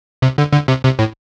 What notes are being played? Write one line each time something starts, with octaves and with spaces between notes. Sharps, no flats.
C3
D3
D3
C3
C3
A2